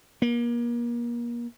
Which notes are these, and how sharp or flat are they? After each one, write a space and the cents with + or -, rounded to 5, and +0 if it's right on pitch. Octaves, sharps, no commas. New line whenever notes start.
A#3 +35